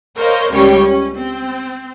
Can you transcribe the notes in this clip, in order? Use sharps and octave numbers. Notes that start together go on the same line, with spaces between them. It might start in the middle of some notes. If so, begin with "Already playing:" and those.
A#4 C5 C#5 D#5 F5
C#2 G3 C#4 C#5 G5
C#4
C4